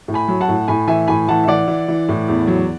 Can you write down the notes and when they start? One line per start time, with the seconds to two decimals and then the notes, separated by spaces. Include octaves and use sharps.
0.08 A2
0.14 G#5 B5
0.28 F#3
0.41 F#5 A5
0.48 A2
0.68 A2 G#5 B5
0.87 E3 E5 G#5
1.07 A2 G#5 B5
1.28 E3 F#5 A5
1.44 E5
1.48 E3 D5 F#5
1.68 E3
1.88 E3
2.09 A2
2.28 E2
2.47 F#3